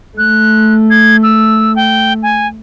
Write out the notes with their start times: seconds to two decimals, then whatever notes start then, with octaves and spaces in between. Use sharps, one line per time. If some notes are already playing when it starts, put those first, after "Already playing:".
0.18 A3 F#6
0.90 G#6
1.23 E6
1.76 G5
2.23 G#5